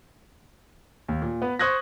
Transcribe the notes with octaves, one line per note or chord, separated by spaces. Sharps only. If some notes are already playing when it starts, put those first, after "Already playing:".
D#2
A#2
B3 B4
C5 C#6 D#6 F#6 G#6 A#6